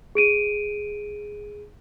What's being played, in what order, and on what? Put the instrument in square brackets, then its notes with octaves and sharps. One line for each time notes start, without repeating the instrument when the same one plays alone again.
[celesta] G#4 D7 D#7